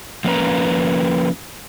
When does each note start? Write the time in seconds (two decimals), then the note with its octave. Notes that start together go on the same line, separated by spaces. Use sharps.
0.24 F3 A#3 C#4 B4 A#5